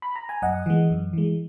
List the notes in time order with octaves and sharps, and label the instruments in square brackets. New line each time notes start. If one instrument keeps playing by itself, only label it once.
[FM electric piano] B5
A#5
G#5
F#2 D#5 F#5
E3 G#3
F#2
E3 G#3